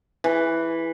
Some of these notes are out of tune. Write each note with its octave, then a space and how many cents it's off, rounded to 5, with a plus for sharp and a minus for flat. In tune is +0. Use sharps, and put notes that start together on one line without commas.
E3 +0